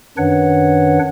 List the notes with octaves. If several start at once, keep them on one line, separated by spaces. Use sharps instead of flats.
F#2 D#3 D4 B4 C#5 F#5